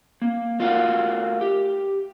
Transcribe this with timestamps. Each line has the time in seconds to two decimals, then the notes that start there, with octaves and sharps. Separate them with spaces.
0.22 A#3
0.59 A3 F4 F#4 A#4 F5 F#5
1.41 G4